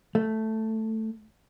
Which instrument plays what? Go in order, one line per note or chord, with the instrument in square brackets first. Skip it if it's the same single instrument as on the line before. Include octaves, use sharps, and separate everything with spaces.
[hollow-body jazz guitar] A3